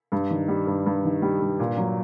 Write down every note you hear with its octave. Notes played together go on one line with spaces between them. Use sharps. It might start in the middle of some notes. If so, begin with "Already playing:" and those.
G2
D#3
G3
G2
G2
D#3
G3
G2
A#2
F#3